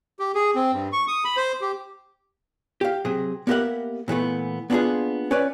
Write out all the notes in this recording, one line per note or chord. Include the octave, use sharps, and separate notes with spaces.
G4
G#4
C4
G2
C#6
D#6
B5
C5
G4
G4 F5
C3 F#3 G#4
A#3 B3 G4 A#4 E5 F#5
A#2 E3 A3 B3
A#3 B3 D4 D#4 F4 G#4
C#4 B4 D5